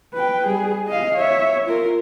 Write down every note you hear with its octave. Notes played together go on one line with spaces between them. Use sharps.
B4 G5
G3 G#4
D#5 F5
C#5 E5
F4 A#4